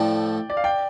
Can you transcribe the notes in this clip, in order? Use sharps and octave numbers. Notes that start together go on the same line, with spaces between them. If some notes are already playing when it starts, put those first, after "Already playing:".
Already playing: A2 F3 A3 D5 G5
D5
F5
D5 G5